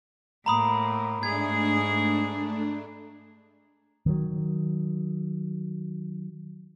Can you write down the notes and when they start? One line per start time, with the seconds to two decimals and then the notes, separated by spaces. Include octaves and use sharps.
0.46 A2 A#3 A#5 B5 D#6
1.23 G#2 A3 D4 G#4 G#6
4.06 D#3 F#3